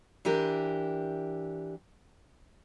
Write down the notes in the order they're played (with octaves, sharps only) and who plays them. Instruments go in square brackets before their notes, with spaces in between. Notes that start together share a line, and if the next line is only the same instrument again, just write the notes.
[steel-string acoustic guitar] E3 D4 G4 A#4